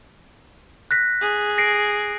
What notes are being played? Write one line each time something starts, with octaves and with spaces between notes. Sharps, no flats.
F#6 A#6 B6
G#4
A#6 C7 D7